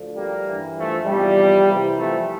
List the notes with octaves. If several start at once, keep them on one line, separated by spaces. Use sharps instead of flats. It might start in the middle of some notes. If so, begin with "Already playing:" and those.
Already playing: D2 D3 F3
G3 A#3
G2 E3
F3 A3
E2 C3 F3 G3
C2 C3 E3
F3 A3